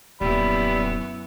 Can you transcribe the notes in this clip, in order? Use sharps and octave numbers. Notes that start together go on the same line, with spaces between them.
D#1 F#2 G3 B3 E4 B5